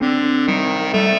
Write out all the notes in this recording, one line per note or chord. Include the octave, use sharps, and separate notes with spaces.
D3 C4
D#3 G3
G3 A3